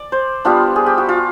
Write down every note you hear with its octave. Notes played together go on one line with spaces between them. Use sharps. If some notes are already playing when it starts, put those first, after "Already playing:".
Already playing: D5
C5
G3 B3 D4 F4
G#4
G4
F#4
F4